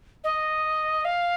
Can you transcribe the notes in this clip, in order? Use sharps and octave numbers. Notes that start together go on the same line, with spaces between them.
D#5
F5